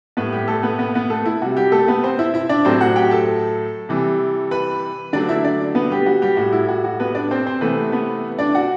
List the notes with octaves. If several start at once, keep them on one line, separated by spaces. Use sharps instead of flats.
A2 G3 B3 B4
G3 G4
A3 A4
B3 B4
B3 B4
B3 B4
A3 A4
E4
C3 G3 F#4
G3 G4
A3 A4
B3 B4
C4 C5
E4 E5
E4 E5
D4 D5
A2 F#3 A3 C4 C5
F#4 F#5
G4 G5
A4 A5
C3 E3 G3
B4 B5
D3 F#3 A3 D4 D5
E4 E5
D4 D5
B3 B4
G3 G4
F#4
G3 G4
A2 G3 F#4
E4
F#4
F#4
B3 B4
D4 D5
C4 C5
C4 C5
C3 E3 A3 B3 B4
B3 B4
D4 D5
F#4 F#5